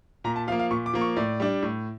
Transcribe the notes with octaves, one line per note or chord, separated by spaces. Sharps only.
A#2 A#5
A5
F3 A#3 F5
F5
A#2 C#6
D6
F3 A#3
C#6
A2 D5
G3 D4
A2